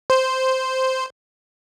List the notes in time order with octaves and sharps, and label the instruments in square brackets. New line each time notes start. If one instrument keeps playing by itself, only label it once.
[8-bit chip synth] C5